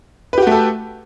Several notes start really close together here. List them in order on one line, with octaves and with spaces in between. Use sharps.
B4 G4 F#4 A3 A4